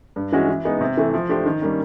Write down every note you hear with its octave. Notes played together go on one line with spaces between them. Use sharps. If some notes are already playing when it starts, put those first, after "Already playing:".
G2
E3 G#3 C#4 F#4
E3
G#3 B3 D#4
C3
E3 A3
F3
A3 D4 G4 C5
D#3
G3 A#3 C#4